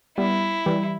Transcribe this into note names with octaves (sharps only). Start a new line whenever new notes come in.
G3 B3 E4
E3 G3